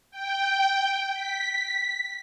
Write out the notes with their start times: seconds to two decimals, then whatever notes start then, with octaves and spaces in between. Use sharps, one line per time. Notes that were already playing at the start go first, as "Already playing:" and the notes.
0.11 G5
1.14 B6